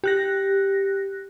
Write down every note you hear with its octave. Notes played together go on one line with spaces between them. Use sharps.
G4 F#6 A#6